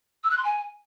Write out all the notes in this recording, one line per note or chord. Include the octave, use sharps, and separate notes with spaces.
E6
F#6
C6
G#5